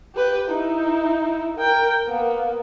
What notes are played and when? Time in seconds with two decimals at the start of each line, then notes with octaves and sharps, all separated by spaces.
0.15 G4 B4
0.50 D#4 E4
1.56 A#4 G5
2.08 A#3 B3